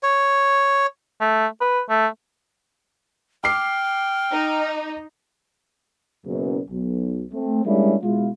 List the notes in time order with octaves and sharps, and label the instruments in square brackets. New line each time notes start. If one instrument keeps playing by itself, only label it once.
[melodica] C#5
[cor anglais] A3
B4
A3
[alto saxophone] G5 [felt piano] D6 C7 [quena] F6
[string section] D#4
[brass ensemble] F#1 F#2 B2
B1
A3 C4
G3 G#3 A#3 C#4 D4 E4
B2 G#3 E4 F4